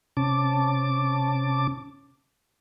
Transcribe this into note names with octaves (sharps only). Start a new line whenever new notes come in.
C3 C#4 A5 D6